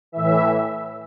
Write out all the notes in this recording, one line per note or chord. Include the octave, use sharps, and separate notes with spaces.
A2 E3 E5